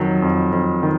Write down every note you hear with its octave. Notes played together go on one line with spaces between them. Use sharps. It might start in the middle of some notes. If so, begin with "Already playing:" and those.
Already playing: F2 D#3 F#3
F2
F2
D#3